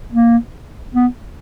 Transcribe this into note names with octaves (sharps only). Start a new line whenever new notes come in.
A#3
B3